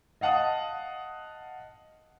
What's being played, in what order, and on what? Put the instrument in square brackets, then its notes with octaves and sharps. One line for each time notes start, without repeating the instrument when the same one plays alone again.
[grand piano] D#5 F5 F#5 A5 D#6